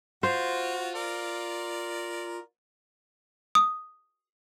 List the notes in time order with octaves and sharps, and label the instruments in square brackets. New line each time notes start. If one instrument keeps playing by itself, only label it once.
[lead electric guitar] F4 [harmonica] F#4 [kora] C5
[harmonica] A#4 D5
[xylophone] D#6